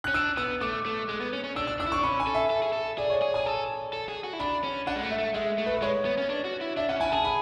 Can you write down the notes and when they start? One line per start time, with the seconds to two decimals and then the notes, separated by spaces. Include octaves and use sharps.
0.04 C#4 F#6
0.14 D4 E6
0.37 B3 E6
0.61 A3 D6
0.86 A3
1.09 G#3
1.21 B3
1.33 C#4
1.44 C#4
1.56 D4 E6
1.67 E6
1.79 D4 E6
1.87 E4
1.92 D4 C#6
2.03 C#4 B5
2.20 G#5
2.27 A4
2.35 E5
2.50 A4
2.62 G#4
2.72 A4
2.98 G#4 D5
3.10 C#5
3.22 G#4
3.34 G#4 G#5
3.46 A4 A5
3.93 A4
4.09 G#4
4.24 F#4
4.33 E4
4.40 D4 B5
4.64 C#4
4.87 D4 F#5
4.96 G#3
5.03 A3
5.11 E5
5.19 A3
5.34 G#3 E5
5.58 A3
5.66 B4
5.77 B4
5.82 G#3 C#5
6.05 B3
6.18 C#4
6.29 D4
6.45 F#4
6.61 E4
6.77 D4 E5
6.89 C#4 F#5
7.00 E4 G#5
7.12 G#4 A5
7.25 B5